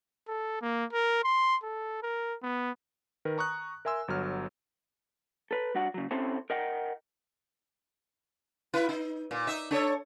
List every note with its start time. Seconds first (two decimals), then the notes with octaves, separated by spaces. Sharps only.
0.28 A4
0.62 A#3
0.93 A#4
1.24 C6
1.63 A4
2.03 A#4
2.43 B3
3.25 D#3 A#4 B4
3.38 A#5 C#6 D#6 F#6
3.85 A#4 E5 G#5 C6 E6
4.08 G1 F#3 F6
5.51 A4 B4
5.75 G3 D4 F#4 F#5
5.94 C#3 F#3
6.11 C4 C#4 E4 G4 A4 C5
6.50 A#4 D#5 F#5 G5
8.74 E4 B4
8.89 D#4
9.31 A#2
9.47 D#4 E5
9.71 D4 A4 C#5